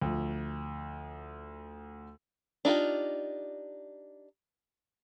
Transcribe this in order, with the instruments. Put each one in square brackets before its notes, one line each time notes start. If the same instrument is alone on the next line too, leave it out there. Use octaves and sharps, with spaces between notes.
[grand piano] D2 F3
[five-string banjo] D4 D#4 F4 G4